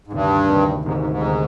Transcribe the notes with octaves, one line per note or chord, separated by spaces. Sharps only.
G#2
D2 G2 C3 D#3
D2 C3 D#3
D2 G#2 C3 D#3
G#2
G#2
D2 C3 D#3